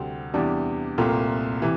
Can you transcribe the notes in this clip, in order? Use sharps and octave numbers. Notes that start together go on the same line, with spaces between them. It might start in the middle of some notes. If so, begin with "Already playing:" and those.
Already playing: D2 C3 G3 C4
E2 C3 E3 G3 D4
C2 A#2 A3 C4 F4
C3 E3